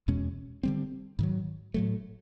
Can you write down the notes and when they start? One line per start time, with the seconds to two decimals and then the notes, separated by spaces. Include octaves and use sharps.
0.08 E2 B2 G#3 C#4
0.63 D3 G3 C4
1.19 G#2 D#3 F#3
1.74 A2 F#3 A3